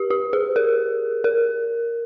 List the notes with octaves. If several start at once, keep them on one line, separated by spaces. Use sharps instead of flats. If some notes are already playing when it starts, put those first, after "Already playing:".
Already playing: G4
G4
G#4
A#4
A#4